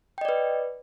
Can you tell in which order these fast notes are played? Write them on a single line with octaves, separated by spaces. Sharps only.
G5 D#5 D5 B4